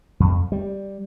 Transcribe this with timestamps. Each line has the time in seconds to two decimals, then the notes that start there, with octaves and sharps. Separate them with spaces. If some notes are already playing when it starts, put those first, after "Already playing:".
0.20 F2
0.52 G3